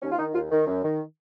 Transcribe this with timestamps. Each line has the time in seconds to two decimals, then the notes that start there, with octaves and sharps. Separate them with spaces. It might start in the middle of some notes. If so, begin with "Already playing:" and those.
0.02 D#2 C#4
0.12 F4
0.18 D#3 D#4
0.34 D#2 F4
0.51 D#3
0.67 F#2
0.84 D#3